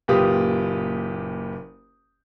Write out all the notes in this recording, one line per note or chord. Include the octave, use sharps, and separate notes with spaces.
F#1 A#2 F4 G4 B4 D#6